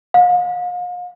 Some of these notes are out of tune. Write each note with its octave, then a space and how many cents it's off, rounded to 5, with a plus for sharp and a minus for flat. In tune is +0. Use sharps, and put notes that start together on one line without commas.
F5 +40